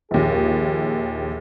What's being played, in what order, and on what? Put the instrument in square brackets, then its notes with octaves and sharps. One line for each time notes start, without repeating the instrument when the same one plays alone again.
[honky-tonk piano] A#1 D#2 [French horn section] G#4